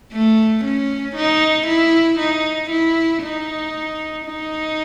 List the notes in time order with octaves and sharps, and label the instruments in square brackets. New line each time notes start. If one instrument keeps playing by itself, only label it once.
[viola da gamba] A3
C#4
D#4
E4
D#4
E4
D#4
D#4